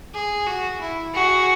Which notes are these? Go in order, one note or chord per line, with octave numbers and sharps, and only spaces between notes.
G#4
F#4
E4
F#4 G#4